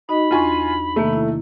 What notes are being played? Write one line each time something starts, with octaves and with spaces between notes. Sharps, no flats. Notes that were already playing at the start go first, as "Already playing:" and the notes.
D#4 F#4 D#5 B5
E2 D4 F4 G#5 C6 C#6
C3 D#3 A3 A#3
E4